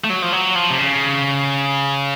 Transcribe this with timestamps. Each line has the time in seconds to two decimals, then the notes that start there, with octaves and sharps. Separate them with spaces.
0.04 A3
0.10 F#3
0.22 F3
0.32 F#3
0.55 F3
0.70 C3
0.79 C#3